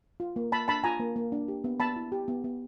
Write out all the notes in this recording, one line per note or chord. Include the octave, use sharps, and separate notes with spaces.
F4
A#3
A#3 A5 B5
D4 A5 B5
F4 G#5 A#5
A#3
A#3
D4
G4
B3
B3 A5 B5
E4
G4
B3
B3